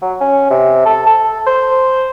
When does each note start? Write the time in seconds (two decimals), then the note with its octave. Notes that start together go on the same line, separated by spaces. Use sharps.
0.02 F#3
0.20 C#4
0.50 C3
0.86 A4
1.06 A4
1.47 C5